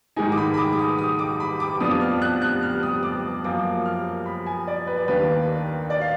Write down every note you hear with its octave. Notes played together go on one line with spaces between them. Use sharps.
G#2 D#3 G#3 D#4 G#5
D6
B5
B5
D6
D6
D#6
D#6
D6
B5
D6
F2 F3 B3 D4 D#6
F6
F#6
F#6
F6
D#6
D6
F#2 F3 A#3 D6
F6
B5
G#5
D5
B4
D5
D#2 D#3 A#3 D4 B4
D5
F5